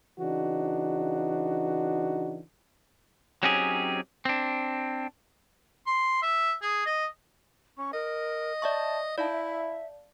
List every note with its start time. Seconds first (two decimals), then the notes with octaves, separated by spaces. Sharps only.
0.20 C#3 E3 D4 D#4 F#4
3.43 F#3 C4 C#4 D#4 G4 G#4
4.25 C4 D4
5.87 C6
6.22 E5
6.62 G#4
6.86 D#5
7.78 C#4 C#6
7.93 A#4 D#5
8.62 D5 E5 A5 C#6
9.18 D#4 E4 D5 F5 A5
9.32 E5